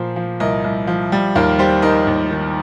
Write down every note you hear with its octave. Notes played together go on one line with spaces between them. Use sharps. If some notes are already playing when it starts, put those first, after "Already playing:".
Already playing: A#2 F3 C5
F3
C2 A#4 D#5
C2
F3
G3
D#2 F4 A#4
G3 G4 C5
D#3 A#4 D#5
D#2
D#3